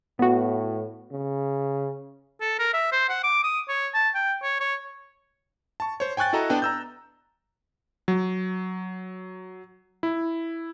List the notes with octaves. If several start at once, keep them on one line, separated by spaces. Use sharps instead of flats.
A2 B3 F#4
C#3
A4
A#4
E5
C5
F#5
D6
D#6
C#5
A5
G5
C#5
C#5
A5 C#6
C5 C#5
G5 G#5 C#6 F#6 A6
E4 F#4 A4 D#5 A#5
B3 D4 G5 A5
A#5 E6 G6
F#3
E4